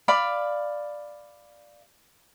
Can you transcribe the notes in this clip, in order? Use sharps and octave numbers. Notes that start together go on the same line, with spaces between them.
D5 F5 B5